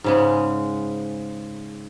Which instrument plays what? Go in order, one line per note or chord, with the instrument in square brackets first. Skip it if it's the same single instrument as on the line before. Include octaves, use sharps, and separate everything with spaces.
[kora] G#2 C#3 G#3